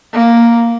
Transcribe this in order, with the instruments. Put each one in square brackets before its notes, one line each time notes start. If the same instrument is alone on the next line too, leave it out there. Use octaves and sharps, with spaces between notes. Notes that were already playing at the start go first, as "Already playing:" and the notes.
[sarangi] A#3